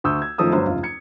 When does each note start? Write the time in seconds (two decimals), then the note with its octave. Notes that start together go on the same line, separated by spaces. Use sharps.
0.04 D2 C#6 D#6 E6 G6
0.22 G#6
0.38 F#2 D#3 F3 A3 D#6 E6
0.52 G1 F#3 C5
0.66 F1 C#2 F4
0.83 G#6 C#7